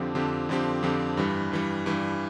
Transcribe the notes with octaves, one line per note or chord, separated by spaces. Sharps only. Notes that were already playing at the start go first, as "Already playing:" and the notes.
Already playing: F2 D3 F3 C4 G4
F2 D3 F3 C4 G4
F2 D3 F3 C4 G4
F2 D3 F3 C4 G4
G2 E3 G3
G2 E3 G3
G2 E3 G3